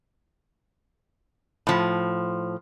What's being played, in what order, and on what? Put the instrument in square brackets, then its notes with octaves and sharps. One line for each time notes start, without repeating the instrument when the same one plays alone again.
[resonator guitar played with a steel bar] A2 F3